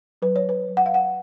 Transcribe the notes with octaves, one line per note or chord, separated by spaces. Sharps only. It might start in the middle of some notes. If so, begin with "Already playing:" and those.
F#3 B4
C#5
B4
F#3
F#5
F5
F#5